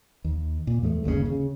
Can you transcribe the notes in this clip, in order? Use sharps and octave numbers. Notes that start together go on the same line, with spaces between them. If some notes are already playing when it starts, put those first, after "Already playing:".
D#2
A#2
E2 A2 F3 A3
G1 D#2 A#2 C#3
C#3